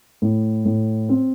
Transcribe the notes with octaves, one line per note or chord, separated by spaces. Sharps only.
A2
A2
C4